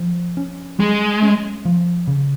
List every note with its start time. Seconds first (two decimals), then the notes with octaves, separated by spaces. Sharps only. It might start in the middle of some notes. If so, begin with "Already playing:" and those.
Already playing: F3
0.37 C#4
0.79 G3 G#3
1.22 C#4
1.65 F3
2.07 C#3